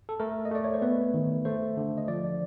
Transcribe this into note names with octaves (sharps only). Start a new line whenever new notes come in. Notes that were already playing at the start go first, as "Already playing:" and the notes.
A4
A3 A#4
D#5
A3 D5
C#5
C5
B3 B4
D#3
A3 C5
D3
D#5
F3 D5